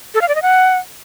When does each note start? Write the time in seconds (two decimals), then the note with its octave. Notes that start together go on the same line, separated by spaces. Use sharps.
0.14 A4
0.21 F5
0.28 D5
0.35 D#5
0.42 F#5